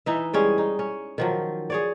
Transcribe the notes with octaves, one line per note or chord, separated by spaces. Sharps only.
E3 D#4 E5
G3 G#3 C#4 G#4
D#4
C#4
D#3 F3 F#3
G#4 C#5 D5